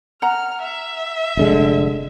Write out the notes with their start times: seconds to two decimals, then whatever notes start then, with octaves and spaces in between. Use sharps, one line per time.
0.22 F#5 A#5 F6
0.63 E5
1.37 F1 D3 G#3